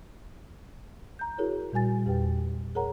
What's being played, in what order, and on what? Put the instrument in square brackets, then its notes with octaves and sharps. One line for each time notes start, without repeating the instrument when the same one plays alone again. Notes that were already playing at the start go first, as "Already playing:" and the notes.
[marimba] A#5 G6
E4 F#4 G#4 A#4 C#5
A#2 G3 F#4 G#5 A6
E2 G4 B4 G5
G#4 A#4 C#5 F#5 A#5